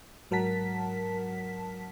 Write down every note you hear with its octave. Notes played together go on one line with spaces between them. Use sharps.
G#2 F#3 A#4 F#5 A5 B6